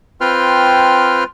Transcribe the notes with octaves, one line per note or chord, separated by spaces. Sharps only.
C4 F4 B4 G5 C6 F6